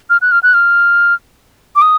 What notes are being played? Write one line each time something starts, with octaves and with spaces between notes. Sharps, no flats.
F6
F#6
F6
F#6
F6
D6
D#6